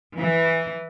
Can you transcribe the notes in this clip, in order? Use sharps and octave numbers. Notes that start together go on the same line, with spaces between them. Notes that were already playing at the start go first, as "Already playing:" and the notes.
E3